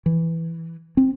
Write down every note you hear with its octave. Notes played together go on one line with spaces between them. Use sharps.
E3
C4